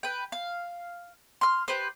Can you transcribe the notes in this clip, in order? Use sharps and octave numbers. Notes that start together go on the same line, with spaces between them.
B4 G5
F5
C6 F6
G4 B4 C5